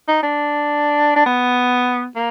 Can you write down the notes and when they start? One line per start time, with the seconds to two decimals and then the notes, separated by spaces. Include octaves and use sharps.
0.08 D#4
0.23 D4
1.16 D4
1.26 B3
2.16 A#3